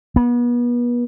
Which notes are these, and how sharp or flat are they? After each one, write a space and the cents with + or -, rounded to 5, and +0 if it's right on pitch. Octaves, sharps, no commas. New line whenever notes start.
B3 -35